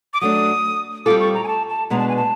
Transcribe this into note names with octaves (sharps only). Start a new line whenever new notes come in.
D6
F#3 A3 D4 D#6
G3 C4 F4 A4 D6
C#6
A#5
G#5
A5
A5
B2 G#3 B3 D4 A#5
A5
G#5
A5